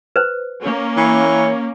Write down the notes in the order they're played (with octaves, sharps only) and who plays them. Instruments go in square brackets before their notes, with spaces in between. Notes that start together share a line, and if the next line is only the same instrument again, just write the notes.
[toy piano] B4 C5
[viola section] A#3 C#4
[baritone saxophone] E3 [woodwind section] C#5